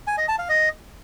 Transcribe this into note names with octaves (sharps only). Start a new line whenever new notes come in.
G#5
D#5
A5
F5
D#5